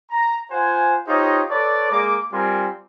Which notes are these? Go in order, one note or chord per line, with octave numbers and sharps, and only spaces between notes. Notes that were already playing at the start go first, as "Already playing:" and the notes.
A#5
F4 C5 F#5 G#5
D#4 F4 G4 C5 C#5 D#5
A4 B4 C#5 D5
G#3 A#3 A#5 D6
G3 C4 F4 A#4 G#5 C6